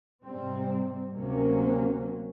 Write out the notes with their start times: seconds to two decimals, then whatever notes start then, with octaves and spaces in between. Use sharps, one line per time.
0.23 G#2 C3 G3 C4
1.15 D2 C3 F#3 A#3 C4 C#4